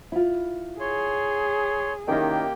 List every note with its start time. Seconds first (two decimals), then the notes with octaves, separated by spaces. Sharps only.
0.12 E4 F4
0.80 G#4 C#5 C6
2.08 D#3 A#3 C#4 E4 G4 G5